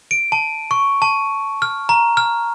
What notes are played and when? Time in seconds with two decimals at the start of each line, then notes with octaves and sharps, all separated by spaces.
0.11 D7
0.32 A5
0.71 C#6
1.02 A5
1.62 F6
1.89 A#5
2.17 F6